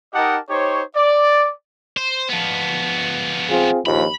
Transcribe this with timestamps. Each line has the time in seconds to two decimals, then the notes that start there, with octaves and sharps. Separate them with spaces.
0.14 D#4 G4 A#4 D#5 F#5 A5
0.50 D#4 G4 C5 C#5
0.96 D5
1.97 C5
2.29 F3 B3
3.50 C4 F4 G#4
3.86 A#1 D#2 F3 B5